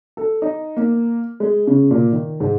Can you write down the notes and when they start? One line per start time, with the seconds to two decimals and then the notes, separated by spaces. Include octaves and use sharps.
0.17 A4
0.42 D#4
0.77 A#3
1.40 G#3
1.67 C#3
1.91 A#2
2.12 D#3
2.40 G#2